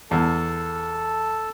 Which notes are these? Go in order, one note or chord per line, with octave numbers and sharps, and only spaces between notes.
E2 A4 A5